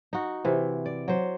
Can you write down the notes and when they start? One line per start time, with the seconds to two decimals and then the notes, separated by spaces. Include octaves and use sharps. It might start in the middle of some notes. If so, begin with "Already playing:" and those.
0.13 D#4 F#4
0.45 C3 E3
0.86 D5
1.08 F#3 C5